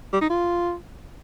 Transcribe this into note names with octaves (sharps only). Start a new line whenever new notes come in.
G3
D#4
F4